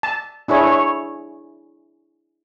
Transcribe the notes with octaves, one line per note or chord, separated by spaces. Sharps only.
A5
D4 E4 G#4 C#5
C#5